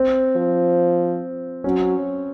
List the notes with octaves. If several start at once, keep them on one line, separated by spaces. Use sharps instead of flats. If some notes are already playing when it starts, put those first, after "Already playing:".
Already playing: C4
F3
F#3 C#4